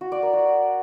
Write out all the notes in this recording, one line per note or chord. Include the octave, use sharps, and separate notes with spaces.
F#4
D5
A#4
F#4